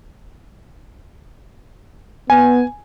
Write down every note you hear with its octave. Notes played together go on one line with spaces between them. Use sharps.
B3 G#5